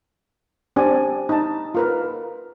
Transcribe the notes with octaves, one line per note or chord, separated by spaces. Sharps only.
C4 D4 G4 D5 G#5
D#4 A5
F4 A#4 B4